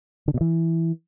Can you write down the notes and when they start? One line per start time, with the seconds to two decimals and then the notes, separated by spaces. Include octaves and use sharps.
0.28 D3
0.34 B2
0.41 E3